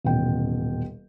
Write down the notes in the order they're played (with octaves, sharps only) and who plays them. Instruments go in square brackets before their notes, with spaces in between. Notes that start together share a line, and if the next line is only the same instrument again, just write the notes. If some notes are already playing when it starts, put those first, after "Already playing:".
[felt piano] D#1 A1 B2 G5